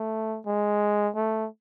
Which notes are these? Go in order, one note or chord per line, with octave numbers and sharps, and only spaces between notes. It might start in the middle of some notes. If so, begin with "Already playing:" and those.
Already playing: A3
G#3
A3